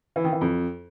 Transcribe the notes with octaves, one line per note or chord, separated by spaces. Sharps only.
E3
D#3
E3
F2